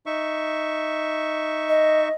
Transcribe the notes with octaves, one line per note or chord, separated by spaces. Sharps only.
D#4 E5 C#6
D#5